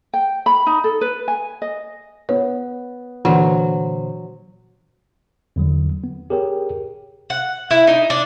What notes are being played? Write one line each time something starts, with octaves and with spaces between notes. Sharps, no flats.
G5
B5
D#4
A4
B4
G#5
D#5
B3 C#5
A#2 D3 E3 F#3 C5
E2 D3 F#3
B3
G4 G#4 A#4 C#5 G5
F#5
E4
D#4
D4